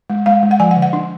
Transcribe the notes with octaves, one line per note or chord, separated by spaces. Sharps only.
G#3
G#3 F5
G#3
F#5
F3 G#5
F#5
D3
F#5
D4